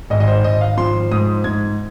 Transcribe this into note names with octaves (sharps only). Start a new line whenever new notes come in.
G#1 D#5
D#5
C5
G#1 D#5
F5
F3 C6
G#2 D#6
G#2 G#6